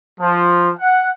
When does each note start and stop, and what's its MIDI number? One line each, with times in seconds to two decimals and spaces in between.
0.20 0.70 53
0.80 1.10 78